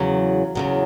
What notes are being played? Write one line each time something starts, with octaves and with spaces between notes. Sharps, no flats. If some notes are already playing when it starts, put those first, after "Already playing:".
Already playing: E2 C#3 F#3
E2 C#3 F#3